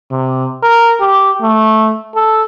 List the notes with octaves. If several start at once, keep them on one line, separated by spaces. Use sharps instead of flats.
C3
A#4
G4
A3
A4